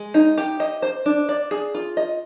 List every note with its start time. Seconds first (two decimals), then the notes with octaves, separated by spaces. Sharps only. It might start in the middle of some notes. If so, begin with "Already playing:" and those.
Already playing: G#3
0.14 D#4
0.38 G4
0.60 D#5
0.82 C5
1.06 D4
1.29 D5
1.51 G#4
1.74 F4
1.97 D#5